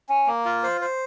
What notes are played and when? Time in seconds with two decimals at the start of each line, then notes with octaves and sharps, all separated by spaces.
0.09 C#4
0.26 A#3
0.45 F4
0.63 C5
0.81 C5